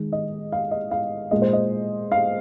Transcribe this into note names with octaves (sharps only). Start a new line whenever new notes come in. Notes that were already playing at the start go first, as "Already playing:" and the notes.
Already playing: D#3 G#3
D#5
F5
D#5
F5
A#2 G#3 D#5
C5
D#5
F5